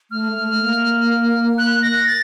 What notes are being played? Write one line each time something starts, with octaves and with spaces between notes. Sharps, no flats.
A3 F6
A3
A#3
F#6
A#6
A6